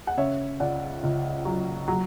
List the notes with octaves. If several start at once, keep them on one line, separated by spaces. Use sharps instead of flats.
F#5
C#3 C#5 E5
C#2 D5 F#5
C#2
F#3
F#3